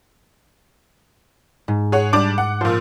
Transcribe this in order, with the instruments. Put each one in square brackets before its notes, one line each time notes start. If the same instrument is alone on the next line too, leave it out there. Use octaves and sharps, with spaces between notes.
[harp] G#2
[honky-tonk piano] G#4 C#5 F#5
G3 D4 D6
F#5
[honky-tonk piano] A#2 F3 [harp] C5 E6 F6